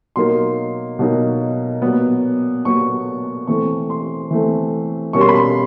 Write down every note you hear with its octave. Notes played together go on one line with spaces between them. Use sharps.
B2 F#3 A#3 D#4 C6
B2 F#3 A#3 D#4
A#2 F#3 B3
A#2 F#3 B3 C#6
E3 A3 C4 C#6
C6
E3 A3 C4
B2 G3 A#3 C#4 C#6
C6
B5
C6